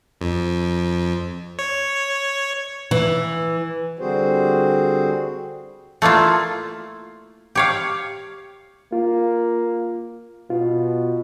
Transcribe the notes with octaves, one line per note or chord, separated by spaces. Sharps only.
F2
C#5
E3
D3 G3 C4 F#4 G#4 C5
A3 A#3 E4 F4
G4 C#5 F5
A#3 F4
B2 F4